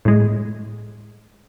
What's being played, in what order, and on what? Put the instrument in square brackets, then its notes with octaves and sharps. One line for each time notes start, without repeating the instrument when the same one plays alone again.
[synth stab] A2 G#3